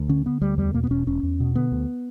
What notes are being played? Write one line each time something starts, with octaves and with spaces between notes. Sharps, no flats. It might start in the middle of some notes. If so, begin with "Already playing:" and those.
Already playing: D2
D3 C#4
D3 B3
D2 G3
E2 G3
B2 A#3
B3
E1 C#4
E1 C#4
E2
B2
D3 B3
D2